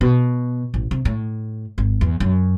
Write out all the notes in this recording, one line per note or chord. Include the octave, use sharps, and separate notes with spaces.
B2
A1
C3
A2
G#1
E2
F#2